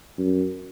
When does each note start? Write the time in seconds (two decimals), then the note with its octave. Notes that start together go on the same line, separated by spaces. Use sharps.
0.18 F#2